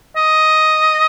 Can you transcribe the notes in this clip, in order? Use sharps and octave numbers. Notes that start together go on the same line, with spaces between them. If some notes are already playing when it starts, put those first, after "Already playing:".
D#5